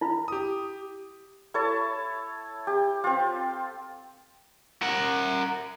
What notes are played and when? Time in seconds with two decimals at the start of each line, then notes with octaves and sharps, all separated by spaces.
0.01 E4 F4 B5
0.28 G4 D#6
1.54 E4 A4 C#5 A5
2.67 G4
3.04 C4 F4
4.82 A#4 F#5